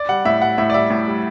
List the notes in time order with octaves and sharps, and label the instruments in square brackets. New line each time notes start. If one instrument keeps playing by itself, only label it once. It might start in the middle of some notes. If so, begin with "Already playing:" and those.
Already playing: [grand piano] D5
G3 F#5
A2 E5
G3 F#5
A2 E5
D5
G3 E5
A2
G3